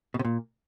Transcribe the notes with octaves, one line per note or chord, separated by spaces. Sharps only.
B2
C3
A#2